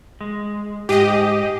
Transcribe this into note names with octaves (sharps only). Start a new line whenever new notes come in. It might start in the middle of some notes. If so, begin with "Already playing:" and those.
G#3
G#2 G4 G#4 D#5